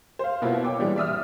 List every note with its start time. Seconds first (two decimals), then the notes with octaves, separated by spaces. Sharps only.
0.19 C5 F5
0.42 B2 A#3 B3 E4 F4
0.65 C#5 G5 D6
0.78 A#2 E3 G3 G#3 D4
0.96 D5 E5 D#6 F6